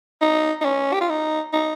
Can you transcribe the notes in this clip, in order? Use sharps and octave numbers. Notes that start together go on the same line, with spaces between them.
D#4
D#4
C#4
G4
F4
D#4
D#4